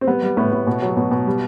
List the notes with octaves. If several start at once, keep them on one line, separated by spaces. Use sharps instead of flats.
C4
G3 B3
G3
A2 B3
A2
B2
F#3
B2
B2
G3